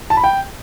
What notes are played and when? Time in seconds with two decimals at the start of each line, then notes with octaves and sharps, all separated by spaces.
0.10 A5
0.17 B5
0.24 G5